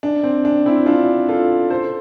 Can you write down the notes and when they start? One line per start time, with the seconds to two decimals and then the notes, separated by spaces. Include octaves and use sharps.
0.03 D4
0.23 C4
0.45 D4
0.66 C4 E4
0.86 D4 F4
1.29 F4 A4
1.70 A4 C5